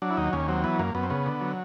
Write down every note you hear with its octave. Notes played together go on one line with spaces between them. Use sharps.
F#3 D4
E4
D#2 D#4
D#2 C#4
F#3 C4
E3 B3
F#2 A#3
F#2 B3
C4
C#3 B3
D3
F#3